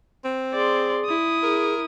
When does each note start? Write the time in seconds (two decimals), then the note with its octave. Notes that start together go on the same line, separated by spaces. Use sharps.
0.25 C4
0.53 G#4 D5 C6
1.05 E4 D#6
1.43 G#4 A#4